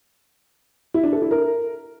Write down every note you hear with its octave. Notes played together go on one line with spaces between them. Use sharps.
E4
D4
A4
E4
A#4